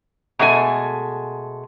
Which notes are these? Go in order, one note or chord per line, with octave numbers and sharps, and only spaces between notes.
B2 G#3 A3 D4 G#5